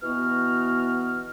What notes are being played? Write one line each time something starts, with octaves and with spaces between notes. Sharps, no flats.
B2 E3 B3 F#4 F6